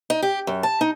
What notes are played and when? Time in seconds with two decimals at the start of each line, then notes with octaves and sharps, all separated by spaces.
0.10 D#4
0.22 G4
0.47 F#2
0.63 A5
0.81 D#4